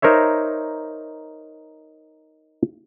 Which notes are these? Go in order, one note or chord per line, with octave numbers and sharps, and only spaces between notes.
D#4 A#4 C5 C#5 E5